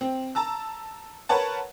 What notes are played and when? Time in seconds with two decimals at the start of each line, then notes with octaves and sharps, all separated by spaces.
0.01 C4
0.35 A5 A#5 E6
1.29 A#4 B4 C#5 F#5 A5